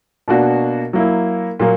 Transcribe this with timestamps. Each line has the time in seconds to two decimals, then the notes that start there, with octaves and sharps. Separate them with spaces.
0.28 B2 A#3 D4 F#4
0.93 F#3 A#3 E4
1.60 A#2 F#3 A#3